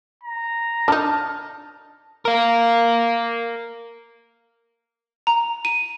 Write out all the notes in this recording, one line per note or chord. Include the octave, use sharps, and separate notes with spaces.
A#5
D4 D#4 A5 F6
A#4 F5
A#5
D#7